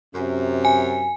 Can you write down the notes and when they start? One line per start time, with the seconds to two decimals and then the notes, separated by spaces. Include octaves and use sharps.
0.15 F#2 C3
0.65 G#5